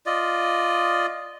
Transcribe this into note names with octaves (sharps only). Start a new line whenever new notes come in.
F4 D5 D#5